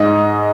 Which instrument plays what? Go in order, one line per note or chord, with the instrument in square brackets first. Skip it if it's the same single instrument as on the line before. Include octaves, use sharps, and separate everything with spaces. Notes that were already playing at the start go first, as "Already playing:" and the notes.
Already playing: [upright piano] G#2 D#5